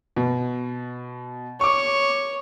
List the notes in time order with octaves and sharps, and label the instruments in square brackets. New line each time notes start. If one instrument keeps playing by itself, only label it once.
[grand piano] B2
[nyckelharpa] C#5 [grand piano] C#6 D6